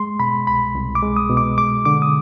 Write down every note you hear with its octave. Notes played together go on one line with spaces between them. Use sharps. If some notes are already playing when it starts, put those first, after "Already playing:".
Already playing: G#3 C6
B2 B5
C2 B5
C2
D6
G#3
D#6
B2
D6
G#3 D6
D3 D6
D#6